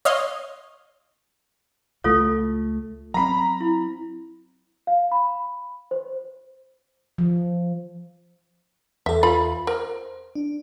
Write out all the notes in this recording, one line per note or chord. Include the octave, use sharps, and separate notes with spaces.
C#5 D#5 F5 C6
C#2 A3 F4 A4 C#5
F#3 C4 A#5 B5
E4
F5
B5
C5
F3
E2 A4 E5
F4 B5
A#4 C5
D4